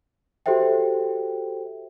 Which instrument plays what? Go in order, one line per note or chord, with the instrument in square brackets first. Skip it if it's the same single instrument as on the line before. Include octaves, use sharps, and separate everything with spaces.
[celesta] F#4 G4 A4 C5 E5 G5